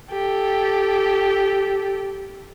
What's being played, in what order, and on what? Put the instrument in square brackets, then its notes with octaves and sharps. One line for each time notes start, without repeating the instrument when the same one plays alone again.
[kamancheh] G4 A4